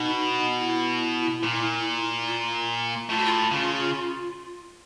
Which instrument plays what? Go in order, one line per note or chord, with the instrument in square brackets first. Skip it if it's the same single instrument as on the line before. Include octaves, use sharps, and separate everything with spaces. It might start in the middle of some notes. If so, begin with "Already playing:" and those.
Already playing: [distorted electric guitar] B2 [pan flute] D#4
[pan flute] E4
[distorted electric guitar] A#2
[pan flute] F4
[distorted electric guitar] A2 [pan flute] F4
[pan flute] F#4
F4
[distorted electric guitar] C#3